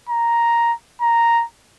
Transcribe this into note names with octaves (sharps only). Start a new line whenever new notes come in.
A#5
A#5